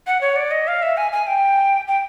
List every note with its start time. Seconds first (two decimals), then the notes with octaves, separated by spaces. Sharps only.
0.07 F#5
0.21 C#5
0.36 D5
0.51 D#5
0.67 F5
0.82 E5
0.97 G#5
1.12 G#5
1.27 G5
1.88 G5